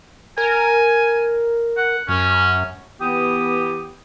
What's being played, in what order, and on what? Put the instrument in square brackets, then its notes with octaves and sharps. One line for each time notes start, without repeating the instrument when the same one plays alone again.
[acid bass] A#4 [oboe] G#5
[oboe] F#5
[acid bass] F#2 [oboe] C#4
[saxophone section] E3 G4 [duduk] B3 [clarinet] D#6